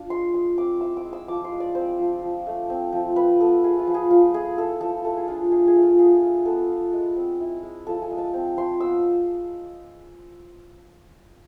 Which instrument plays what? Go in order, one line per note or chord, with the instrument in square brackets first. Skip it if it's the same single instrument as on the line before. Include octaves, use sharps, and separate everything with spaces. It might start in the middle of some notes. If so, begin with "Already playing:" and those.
Already playing: [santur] D4 F4
G#3 C6
G#3 C6
C4 D6
E4 E6
D6
G#3
E6
F3 D6
C6
G#3
D5
C4 C5
F3
F3
A3
C4
F3
F3 B4
B3 A4
F4 G#4
F4
F3
G#4
F3 F4
A3 G#4
E4 A4
F3 A4
A3 A4
G#4
D4 F4
F4 G#4
G#4
A3
F4
B3 G#4
F4
B3 A4
F4
G#3
C4
E4
G#3
F3 A4
G#5
G#3
A5
C4
F3 C6
B3 E6